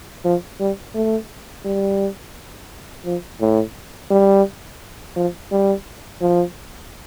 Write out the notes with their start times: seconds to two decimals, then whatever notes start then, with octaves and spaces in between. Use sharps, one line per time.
0.25 F3
0.60 G3
0.95 A3
1.65 G3
3.05 F3
3.40 A2
4.10 G3
5.16 F3
5.51 G3
6.21 F3